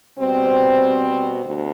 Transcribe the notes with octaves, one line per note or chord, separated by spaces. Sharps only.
B2 G3 C4
D2